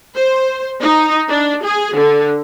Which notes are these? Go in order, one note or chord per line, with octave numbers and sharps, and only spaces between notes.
C5
D#4
D4
G#4
D3